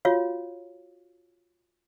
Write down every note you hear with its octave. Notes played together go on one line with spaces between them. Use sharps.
F4 F#4 C#5 F5